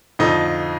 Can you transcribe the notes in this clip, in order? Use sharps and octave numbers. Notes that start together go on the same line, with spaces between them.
F2 D3 F3 D#4